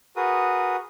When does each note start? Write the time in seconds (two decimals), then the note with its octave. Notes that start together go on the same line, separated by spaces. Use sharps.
0.16 F#4 G#4 A#4 B4 D#6